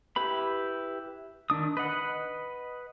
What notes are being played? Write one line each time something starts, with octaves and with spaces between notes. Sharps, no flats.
E4 G4 B4 B5
D#3 D4 D#6
B4 D#5 F#5